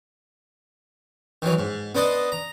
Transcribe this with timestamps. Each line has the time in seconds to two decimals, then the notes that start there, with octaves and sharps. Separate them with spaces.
1.42 D#3 E3 F#3
1.59 G#2
1.95 B3 D4 C5 D#5 A5
2.32 A#5